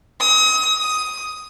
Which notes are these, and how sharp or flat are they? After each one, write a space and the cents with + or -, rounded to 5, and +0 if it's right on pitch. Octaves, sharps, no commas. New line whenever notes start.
D#6 +35
D#6 +10